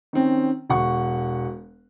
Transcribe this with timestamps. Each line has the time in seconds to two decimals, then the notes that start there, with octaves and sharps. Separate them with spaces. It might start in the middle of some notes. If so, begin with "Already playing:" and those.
0.13 D#3 C4 C#4
0.70 E1 F#5 C#6